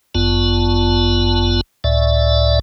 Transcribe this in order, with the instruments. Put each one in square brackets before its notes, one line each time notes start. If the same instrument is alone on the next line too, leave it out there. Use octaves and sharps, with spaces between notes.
[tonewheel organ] G1 F#2 B3 F4 A5
C#2 A2 D5 E5